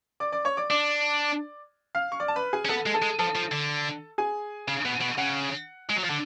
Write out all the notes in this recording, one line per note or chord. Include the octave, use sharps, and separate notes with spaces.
D5 D6
D5 D6
C#5 C#6
D5 D6
D4 D5 D6
F5 F6
C#6
D5 D6
A5
B4 B5
G#4 G#5
C#4
B3 A4 A5
G#3
A4 A5
G#3
F3 A4 A5
F3
D3
G#4 G#5
C#3
B2
B2
C#3 F#5
G#3
F#3
F3
D3